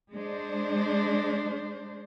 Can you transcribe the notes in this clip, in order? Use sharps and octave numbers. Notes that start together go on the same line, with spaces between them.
G#3 D4 C5